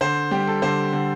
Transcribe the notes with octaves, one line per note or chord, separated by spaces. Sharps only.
D3 C5
G3 G4
A4
D3 C5
D3